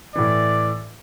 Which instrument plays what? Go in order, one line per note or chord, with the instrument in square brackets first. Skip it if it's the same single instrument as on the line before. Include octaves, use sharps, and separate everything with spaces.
[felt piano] A2 E3 [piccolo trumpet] D5